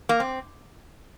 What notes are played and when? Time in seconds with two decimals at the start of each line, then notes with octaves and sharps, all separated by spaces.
0.09 A#3
0.20 C4